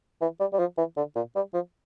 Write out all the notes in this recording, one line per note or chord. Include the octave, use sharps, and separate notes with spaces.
E3
G3
G3
F3
E3
D3
A#2
G3
F3